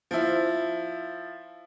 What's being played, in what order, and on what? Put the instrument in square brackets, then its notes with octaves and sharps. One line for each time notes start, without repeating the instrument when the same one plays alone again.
[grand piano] F3 E4